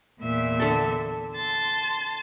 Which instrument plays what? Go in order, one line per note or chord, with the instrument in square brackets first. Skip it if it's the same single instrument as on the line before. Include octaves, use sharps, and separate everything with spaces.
[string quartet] E2 A#2 E5
[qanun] D3 A4
[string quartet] A5 C6 A6